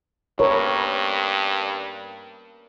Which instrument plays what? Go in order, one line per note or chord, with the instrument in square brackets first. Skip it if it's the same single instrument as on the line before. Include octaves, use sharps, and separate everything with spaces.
[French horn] G2 [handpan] A#4 B4 C#5